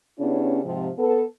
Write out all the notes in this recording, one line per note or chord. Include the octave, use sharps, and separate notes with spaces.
C#3 B3 C#4 D4 E4 G4
G#2 C3 F3
B3 A4